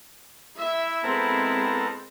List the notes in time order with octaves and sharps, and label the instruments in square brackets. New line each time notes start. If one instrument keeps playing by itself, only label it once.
[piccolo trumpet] E4 [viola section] E5
[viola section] G#3 C4 [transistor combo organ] B3 A4 A#4 [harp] C5